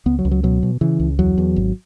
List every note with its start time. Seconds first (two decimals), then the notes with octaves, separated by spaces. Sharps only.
0.06 C#2 B3
0.19 F#3
0.25 C#2
0.31 F#3
0.43 B2 F#3
0.63 B2
0.81 C#3 E3
1.00 C#2
1.19 E2 F#3
1.38 E2
1.56 G#1